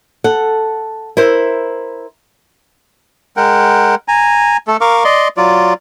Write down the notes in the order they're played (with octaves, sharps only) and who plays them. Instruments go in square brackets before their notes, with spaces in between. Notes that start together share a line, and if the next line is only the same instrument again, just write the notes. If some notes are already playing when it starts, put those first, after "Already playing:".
[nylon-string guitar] A4 F#5
E4 A#4 C5
[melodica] G#3 A#4 F#5 G5
G#5 A#5
A3 A4
A#4 F5 C#6 D6
D5 D#5 C6
F#3 F4 D5